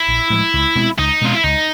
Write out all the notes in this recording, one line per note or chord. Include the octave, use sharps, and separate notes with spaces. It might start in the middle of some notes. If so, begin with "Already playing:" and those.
Already playing: E4
A#1
A2 F3 G#3
C#2
B2 G#3 C4
C#2 D#4
B2 G#3 C4 F4
E4
C#2 D#4